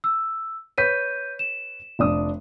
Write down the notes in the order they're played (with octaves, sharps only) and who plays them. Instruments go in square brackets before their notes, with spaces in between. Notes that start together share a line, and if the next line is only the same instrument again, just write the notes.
[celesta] E6
[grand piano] B4 C#5 B6 [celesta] G6 D#7
[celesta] E7
[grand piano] F1 D4 D#6